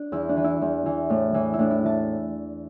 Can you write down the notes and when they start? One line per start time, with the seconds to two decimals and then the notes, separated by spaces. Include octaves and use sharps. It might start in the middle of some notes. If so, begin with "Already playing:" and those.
Already playing: D4
0.12 E2 E4
0.29 D4
0.36 E3
0.44 E4
0.62 E2
0.86 E3
1.10 A2
1.34 E3
1.53 E4
1.59 A2 D4
1.71 E4
1.84 E3 A5